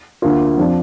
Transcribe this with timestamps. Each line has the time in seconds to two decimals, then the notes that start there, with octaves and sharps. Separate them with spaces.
0.22 D2 D3 A#3 F4
0.57 F2 F3 D4